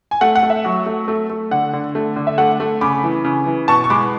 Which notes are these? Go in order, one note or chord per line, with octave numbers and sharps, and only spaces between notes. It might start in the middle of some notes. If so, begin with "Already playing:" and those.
G#5
A3 F#5
F#5
A3
E5
F#3
A3
A3
A3
D3 F#5
D3
A3
D3
E5
A3 F#5
A3
C#3 B5 D6
E3
C#3
E3
B2 A5 C#6
C#6
G#3 B5 D6